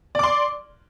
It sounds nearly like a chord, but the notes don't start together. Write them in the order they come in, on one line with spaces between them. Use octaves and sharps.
D5 D6 C6